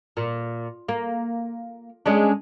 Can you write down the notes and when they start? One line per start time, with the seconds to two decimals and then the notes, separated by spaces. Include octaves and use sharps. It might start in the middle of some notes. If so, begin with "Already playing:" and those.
0.17 A#2
0.89 A#3
2.06 G#3 C#4 D4